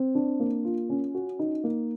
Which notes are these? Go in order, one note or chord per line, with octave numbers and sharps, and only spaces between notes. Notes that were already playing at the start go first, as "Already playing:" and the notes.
Already playing: C4
D4
A#3
F4
C#4
F#4
D#4
A#3